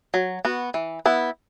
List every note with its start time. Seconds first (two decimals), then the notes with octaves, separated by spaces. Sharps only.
0.14 F#3
0.45 B3 F#4
0.74 E3
1.06 B3 E4